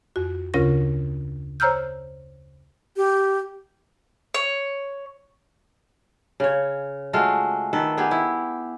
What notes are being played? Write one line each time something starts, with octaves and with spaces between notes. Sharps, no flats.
F2 F#4
D2 C#3 C#4 F4 A#4 A#6
C5 C#5 A#5 E6 F6 G6
G4
C#5
C#3 C#5
G#3 A3 F4 F#4
D#3 A4 B4
B3 G4 G#4
E4